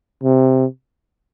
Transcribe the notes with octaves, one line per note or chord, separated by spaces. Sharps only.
C3